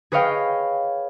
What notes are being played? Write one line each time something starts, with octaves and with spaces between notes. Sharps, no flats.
G#4 B4 C#5 D#5 F5 G5